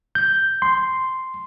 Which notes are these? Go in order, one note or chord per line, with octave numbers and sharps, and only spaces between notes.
G6
C6